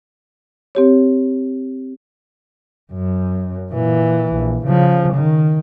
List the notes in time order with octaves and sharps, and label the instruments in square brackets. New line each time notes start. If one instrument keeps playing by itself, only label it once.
[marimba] C4 G4 C#5
[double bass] F#2
A#2 E3
A#1
C#3 F3
D#3